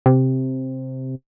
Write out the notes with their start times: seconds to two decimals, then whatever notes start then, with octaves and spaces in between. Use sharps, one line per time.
0.06 C3